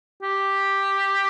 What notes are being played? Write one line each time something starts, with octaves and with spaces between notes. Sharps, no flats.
G4